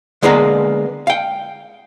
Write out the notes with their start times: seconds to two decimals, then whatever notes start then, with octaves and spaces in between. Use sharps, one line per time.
0.22 D3 G#3 A#3 B3 G#4 A#4
1.07 F5 G5